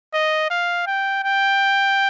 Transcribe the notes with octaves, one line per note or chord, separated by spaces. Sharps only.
D#5
F5
G5
G5